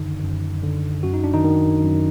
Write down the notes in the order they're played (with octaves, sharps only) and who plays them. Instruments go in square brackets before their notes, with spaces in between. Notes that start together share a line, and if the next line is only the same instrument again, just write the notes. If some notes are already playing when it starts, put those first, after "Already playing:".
Already playing: [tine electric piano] F#2 D3 D#3 D#4
F#2
D3
F#2 F#4
D#4
D4
D#3 D#4
D#3
F#2